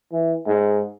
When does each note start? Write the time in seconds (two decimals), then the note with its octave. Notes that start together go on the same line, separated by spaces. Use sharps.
0.12 E3
0.46 G#2